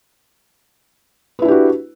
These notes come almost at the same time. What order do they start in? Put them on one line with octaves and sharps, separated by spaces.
B4 E4 D4 G4 F#4